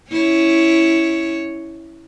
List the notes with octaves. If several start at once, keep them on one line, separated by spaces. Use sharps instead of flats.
C#4 E4 C#5